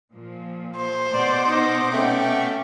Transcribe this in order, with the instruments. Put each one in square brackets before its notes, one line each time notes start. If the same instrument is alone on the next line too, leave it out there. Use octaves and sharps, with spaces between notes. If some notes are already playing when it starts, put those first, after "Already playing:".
[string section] A#2 F3
[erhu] C5
[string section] B2 F#5 D6 [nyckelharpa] D5
[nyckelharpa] D#4
[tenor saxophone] A3 [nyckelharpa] C#4 [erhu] G5